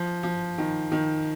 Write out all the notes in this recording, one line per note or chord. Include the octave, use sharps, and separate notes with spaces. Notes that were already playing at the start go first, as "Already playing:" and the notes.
Already playing: F3
F3
D#3
D#3